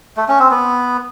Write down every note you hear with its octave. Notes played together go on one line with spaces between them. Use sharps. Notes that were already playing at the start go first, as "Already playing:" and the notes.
A3
C#4
C4
B3